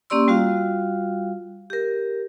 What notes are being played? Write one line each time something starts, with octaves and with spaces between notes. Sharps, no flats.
A#3 C#4 G4 D5 C6 E6
G3 F4 F#4 F5
G4 A#4